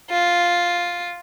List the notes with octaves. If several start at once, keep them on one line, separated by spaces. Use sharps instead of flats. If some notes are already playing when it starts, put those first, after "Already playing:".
F4